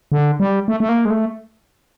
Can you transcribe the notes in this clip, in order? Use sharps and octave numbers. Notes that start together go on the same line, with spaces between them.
D3
G3
A3
A3
A#3
G#3
A3